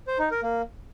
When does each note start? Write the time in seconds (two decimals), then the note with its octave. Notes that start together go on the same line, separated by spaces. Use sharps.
0.07 C5
0.19 D#4
0.31 A#4
0.43 A#3